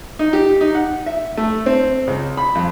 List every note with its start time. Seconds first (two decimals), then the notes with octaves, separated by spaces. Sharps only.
0.19 D#4
0.33 G4
0.61 D#4
0.75 F#5
1.06 E5
1.37 A3
1.66 C4
2.07 C#2
2.37 B5
2.55 F2